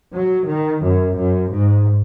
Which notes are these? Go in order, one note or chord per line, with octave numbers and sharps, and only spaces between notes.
F#3
D#3
F#2
F#2
G#2